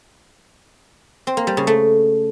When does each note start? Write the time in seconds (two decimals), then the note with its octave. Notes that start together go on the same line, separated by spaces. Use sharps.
1.27 C4
1.37 A#3
1.47 G3
1.57 C#3
1.67 A3